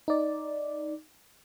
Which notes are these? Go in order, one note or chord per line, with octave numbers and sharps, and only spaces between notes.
D#4 D5